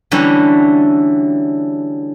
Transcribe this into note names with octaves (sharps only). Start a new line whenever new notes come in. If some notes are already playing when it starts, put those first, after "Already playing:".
D3 E3 F#3 G3 A3 C#4